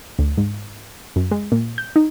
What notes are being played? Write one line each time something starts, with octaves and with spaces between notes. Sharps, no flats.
D2
G#2
F#2
G#3
A#2
G6
D#4